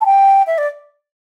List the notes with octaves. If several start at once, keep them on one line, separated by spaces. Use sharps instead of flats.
A5
G5
E5
D5